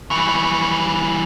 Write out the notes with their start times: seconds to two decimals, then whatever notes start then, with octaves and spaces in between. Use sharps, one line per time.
0.11 E3 G3 C#6